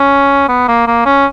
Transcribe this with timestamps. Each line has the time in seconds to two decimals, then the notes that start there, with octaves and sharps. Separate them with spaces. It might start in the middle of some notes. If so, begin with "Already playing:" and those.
Already playing: C#4
0.49 B3
0.68 A#3
0.87 A#3
1.06 C#4